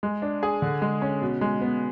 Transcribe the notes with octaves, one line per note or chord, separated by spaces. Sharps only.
G#3
D4
G#4
D3
G#3
C#4
B2
G#3
B3